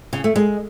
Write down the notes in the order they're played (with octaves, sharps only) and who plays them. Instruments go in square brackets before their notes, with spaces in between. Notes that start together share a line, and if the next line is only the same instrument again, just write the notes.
[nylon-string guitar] C#3
A3
G#3